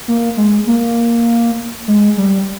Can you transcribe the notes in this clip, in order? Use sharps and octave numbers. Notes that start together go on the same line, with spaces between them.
A#3
G#3
A#3
G#3
G3